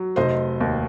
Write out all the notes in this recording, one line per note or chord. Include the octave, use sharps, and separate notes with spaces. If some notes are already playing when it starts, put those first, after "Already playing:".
Already playing: F#3
F1 C5 D#5
D#2